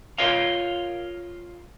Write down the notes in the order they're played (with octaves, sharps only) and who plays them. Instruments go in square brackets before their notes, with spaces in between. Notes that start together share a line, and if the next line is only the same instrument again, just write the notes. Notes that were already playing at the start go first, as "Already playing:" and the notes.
[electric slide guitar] F4 A#4 C#5 D#5 F5